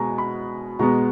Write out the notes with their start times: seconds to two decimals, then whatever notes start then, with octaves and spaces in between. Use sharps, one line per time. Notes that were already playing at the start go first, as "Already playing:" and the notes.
Already playing: B2 G#3 B3 G#5 A#5
0.18 B5
0.79 B2 G#3 B3 A#5